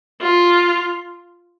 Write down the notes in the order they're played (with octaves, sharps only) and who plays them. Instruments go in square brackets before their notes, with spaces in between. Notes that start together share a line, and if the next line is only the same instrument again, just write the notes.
[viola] F4